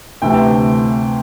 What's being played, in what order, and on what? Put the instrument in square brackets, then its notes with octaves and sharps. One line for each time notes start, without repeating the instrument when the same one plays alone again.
[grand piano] D2 C3 E3 A3 G5